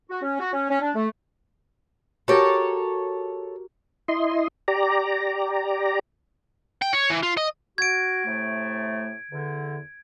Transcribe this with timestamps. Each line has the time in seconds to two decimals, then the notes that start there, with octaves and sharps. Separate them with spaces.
0.10 F#4
0.23 C#4
0.40 F#4
0.52 C#4
0.70 C#4
0.81 D4
0.95 A3
2.28 F#4 G4 A4 A#4 C#5
4.08 E4 D#5 C6
4.68 G4 D5 A#5
6.82 G5
6.93 C#5
7.10 E3
7.23 F4
7.37 D#5
7.78 F#4 G#6 D7
8.26 A2 C3 A3
9.31 E2 D3